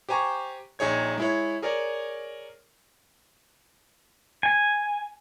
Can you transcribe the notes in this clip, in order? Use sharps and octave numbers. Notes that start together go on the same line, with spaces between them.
G4 C5 G#5 A#5 C#6
A#1 D#4 G#4 C#5 G#6
G#3 E4 C#5
G#4 A#4 C#5 D5
G#5